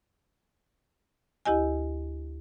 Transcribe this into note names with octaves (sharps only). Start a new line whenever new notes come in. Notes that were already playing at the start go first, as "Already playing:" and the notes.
D2 E4 G4 D#5 G#5